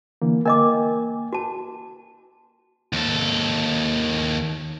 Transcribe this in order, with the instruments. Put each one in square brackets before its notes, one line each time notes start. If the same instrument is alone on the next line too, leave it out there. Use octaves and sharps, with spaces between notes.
[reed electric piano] D3 E3 A#3
[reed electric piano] A#3 G5 G#5 [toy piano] A#4 D#5 D6
[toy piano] F#4 A5
[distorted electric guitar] D#2 A4